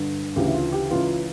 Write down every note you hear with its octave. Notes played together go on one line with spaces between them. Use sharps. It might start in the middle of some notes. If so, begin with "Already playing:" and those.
Already playing: G2 D3
D2 C#3 E3 G4
E4
F4
G4
C#2 C#3 E3 F4